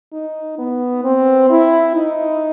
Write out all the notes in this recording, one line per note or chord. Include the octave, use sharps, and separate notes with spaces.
D#4
B3
C4
E4
D#4